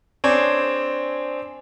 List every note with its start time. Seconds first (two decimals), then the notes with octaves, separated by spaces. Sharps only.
0.24 C4 D4 G#4 C#5 D5